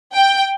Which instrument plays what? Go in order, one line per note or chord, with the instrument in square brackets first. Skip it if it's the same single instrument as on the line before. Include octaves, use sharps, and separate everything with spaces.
[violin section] G5